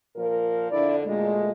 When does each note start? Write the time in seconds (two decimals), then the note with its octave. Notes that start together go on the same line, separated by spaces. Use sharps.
0.16 A#2 F3 A#4
0.71 F2 D3 D4 E4 D5
1.05 D2 A#2 G#3 A3